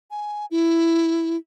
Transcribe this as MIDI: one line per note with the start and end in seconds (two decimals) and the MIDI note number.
0.11 0.46 80
0.51 1.37 64